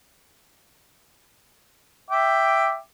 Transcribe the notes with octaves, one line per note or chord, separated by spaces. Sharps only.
E5 G5 D6